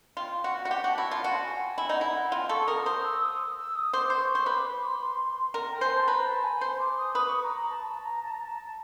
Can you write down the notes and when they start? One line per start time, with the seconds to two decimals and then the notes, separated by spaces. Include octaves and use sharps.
0.17 F4 G5
0.44 F#4
0.52 F#5
0.65 F#4
0.71 G4 G5
0.84 F#4 A5
0.98 E4
1.06 A5
1.11 F4
1.24 F#4 A5
1.43 G#5
1.60 G5
1.78 E4 G#5
1.89 D#4
1.95 F#5
2.01 E4
2.14 F#5
2.32 F4 G5
2.49 A4 C#6
2.68 A#4 D#6
2.85 C5 D#6
3.03 E6
3.21 D#6
3.57 E6
3.75 D#6
3.93 C5 D6
4.10 C5
4.20 C#6
4.35 C5
4.46 B4 D6
4.82 D6
4.86 C6
5.54 A#4
5.70 G5
5.81 C5 G#5
5.95 A5
6.07 B4 A#5
6.26 A5
6.43 G#5
6.61 C5
6.79 D6
6.97 D#6
7.15 B4 D#6
7.28 C#6
7.42 A#5
7.55 A#5
7.69 A5
7.87 A5
8.04 A#5
8.22 A5
8.31 A#5
8.40 A5